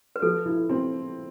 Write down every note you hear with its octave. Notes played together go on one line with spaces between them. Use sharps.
B4
F3 A4
E4
C4